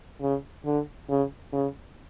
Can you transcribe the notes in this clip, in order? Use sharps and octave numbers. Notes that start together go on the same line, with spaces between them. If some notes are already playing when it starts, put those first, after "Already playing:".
C#3
D3
C#3
C#3